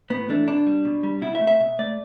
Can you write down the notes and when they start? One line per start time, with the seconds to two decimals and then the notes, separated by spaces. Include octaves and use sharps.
0.10 A2 B3
0.29 E3 A3 D4
0.47 B2 D4
0.67 G3
0.85 B2
1.03 G3
1.22 B2 E4
1.35 E5
1.41 A3
1.47 E5
1.60 B2 E5
1.79 A3 D5